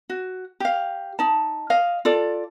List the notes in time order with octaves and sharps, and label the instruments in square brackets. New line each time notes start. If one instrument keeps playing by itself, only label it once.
[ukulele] F#4
G4 F5
D#4 A5
D#5 F5
F4 A4 D5